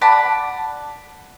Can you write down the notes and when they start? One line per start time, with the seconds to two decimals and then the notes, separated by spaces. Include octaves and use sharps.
0.01 D5 F#5 A5 B5